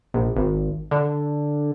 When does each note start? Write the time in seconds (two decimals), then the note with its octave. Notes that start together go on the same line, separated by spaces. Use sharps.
0.14 A#1
0.36 G#1
0.91 D3